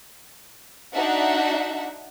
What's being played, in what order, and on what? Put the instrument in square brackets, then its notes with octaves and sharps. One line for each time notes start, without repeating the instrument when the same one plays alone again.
[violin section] D4 D#4 F#4 E5 F#5